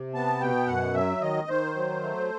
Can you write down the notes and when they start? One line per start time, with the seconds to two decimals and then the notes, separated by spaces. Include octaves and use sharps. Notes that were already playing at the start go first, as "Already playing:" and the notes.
Already playing: C3
0.14 B3 A5
0.40 B2 G5
0.67 F#2 F#5
0.94 F#3 E5
1.21 D#3 D#5
1.48 D#3 C5
1.76 F#3
2.02 A3